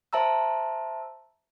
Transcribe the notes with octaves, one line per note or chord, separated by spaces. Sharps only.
C5 E5 A5 A#5 E6